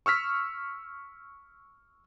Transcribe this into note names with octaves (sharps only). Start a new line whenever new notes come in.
C#6 E6 F6 B6